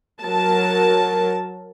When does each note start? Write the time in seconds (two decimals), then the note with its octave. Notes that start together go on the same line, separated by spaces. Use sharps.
0.21 F#3 A#4 A5